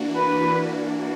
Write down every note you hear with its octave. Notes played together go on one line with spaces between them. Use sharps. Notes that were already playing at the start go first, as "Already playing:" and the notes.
Already playing: E3 A#3 D4 F#4
B4